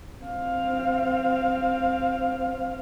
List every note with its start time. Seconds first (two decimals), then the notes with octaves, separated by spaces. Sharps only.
0.23 C4 F5